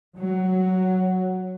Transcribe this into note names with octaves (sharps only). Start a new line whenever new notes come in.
F#3